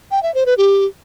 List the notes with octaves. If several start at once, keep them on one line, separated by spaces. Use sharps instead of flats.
G5
E5
C5
B4
G4